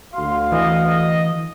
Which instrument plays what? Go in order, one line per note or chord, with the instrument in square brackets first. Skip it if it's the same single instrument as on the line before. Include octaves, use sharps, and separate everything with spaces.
[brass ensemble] D2 F#4 F5 [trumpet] C6
[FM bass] E3 [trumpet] D#5
[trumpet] D#5